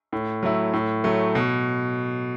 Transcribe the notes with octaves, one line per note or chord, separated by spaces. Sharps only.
A2
F#3 A3 E4
A2
F#3 A3
B2